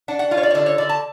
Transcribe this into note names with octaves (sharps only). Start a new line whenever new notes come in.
D4 F#5
F#5
F4 F5
C#5
D5
C#5
D3 D5
C#5
D3 D5
A5